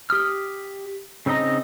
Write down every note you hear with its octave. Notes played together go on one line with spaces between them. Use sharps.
G4 D#6 F6
C#3 C4 D#4 D#5 A#5